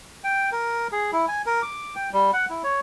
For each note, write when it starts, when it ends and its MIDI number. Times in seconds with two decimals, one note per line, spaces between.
0.24 0.50 79
0.52 0.87 70
0.92 1.11 68
1.12 1.25 64
1.28 1.42 80
1.46 1.62 70
1.62 1.95 86
1.96 2.10 79
2.13 2.31 55
2.33 2.45 78
2.50 2.62 64
2.64 2.80 73